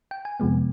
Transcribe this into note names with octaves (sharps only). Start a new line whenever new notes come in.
G5
G#5
F2 C3 F3 G#3 B3